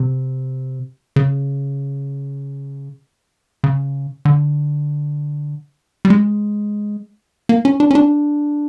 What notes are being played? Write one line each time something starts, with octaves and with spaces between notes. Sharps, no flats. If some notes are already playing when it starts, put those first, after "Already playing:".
Already playing: C3
C#3
C#3
D3
G3
G#3
A#3
C#4
D4
C#4
D4